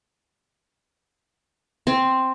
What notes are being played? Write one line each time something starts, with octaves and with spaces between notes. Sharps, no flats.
C4